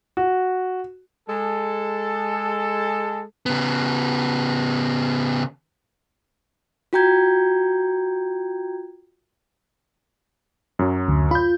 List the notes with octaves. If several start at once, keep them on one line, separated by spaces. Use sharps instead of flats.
F#4
G#3 A4
C#3 B3
F4 F#4 G5 A#5 G6 G#6
F#2 F#3
D2
F4 B5 G6